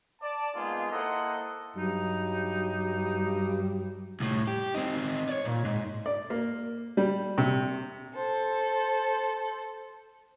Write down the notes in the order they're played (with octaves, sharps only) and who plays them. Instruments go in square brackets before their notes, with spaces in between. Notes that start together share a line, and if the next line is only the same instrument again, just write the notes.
[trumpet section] D5 A5
G#3 A#3 B3 D#4 F4 G#4
A#3 E4 A4 C5 D#5 F#5
[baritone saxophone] G2 [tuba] F#3 [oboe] D#4
[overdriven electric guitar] C2 A2
G4
C4 D#4
C#5 D5
A#2
G#2
[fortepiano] D5
A#3
G3
C3
[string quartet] A4 C5